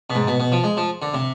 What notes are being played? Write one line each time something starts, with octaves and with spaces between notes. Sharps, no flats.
B2
G#2
B2
B2
F3
G#3
F3
D3
C3